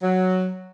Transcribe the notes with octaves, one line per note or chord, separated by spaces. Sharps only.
F#3